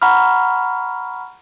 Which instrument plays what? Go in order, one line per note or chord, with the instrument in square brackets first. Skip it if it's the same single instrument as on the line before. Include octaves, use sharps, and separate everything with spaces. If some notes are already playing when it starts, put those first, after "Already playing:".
[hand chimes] F#5 A#5 B5 C#6 F6